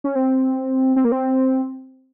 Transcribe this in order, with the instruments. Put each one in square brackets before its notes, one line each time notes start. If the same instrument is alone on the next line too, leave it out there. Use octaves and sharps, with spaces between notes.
[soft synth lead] C#4
C4
C4
A#3
C4